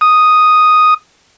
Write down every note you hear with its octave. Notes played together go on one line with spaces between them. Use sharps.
D#6